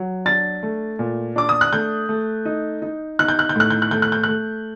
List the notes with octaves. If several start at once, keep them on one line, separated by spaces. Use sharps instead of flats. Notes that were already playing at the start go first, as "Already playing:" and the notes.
Already playing: F#3
D4 A6
A3
A#2
D4 D6
D#6
F#6
A3 G6
A3
D#4
D#4
D#4 F#6
G6
F#6
G6
A2 F#6
G6
F#6
A3 G6
F#6
G6
A3 F#6